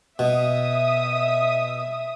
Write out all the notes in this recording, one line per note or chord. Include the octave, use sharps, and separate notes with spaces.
B2 E5 D#6